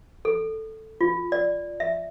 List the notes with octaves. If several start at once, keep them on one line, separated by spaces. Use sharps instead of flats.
A4
F4
D5
E5